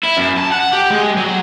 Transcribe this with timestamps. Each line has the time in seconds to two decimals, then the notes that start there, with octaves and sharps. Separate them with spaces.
0.04 E4
0.17 F#2
0.38 A5
0.52 F#5
0.73 G4
0.90 G#3
1.17 F#3